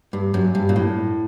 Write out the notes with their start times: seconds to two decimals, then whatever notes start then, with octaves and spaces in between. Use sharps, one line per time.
0.13 G2
0.34 F#2
0.55 G2
0.69 A#2
0.76 A2